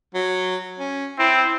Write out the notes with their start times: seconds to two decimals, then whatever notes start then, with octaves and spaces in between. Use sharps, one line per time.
0.15 F#3
0.79 C#4
1.19 C4 E4